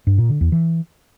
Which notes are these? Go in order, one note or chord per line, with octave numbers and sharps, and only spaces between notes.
G2
A#2
D3
E2
E3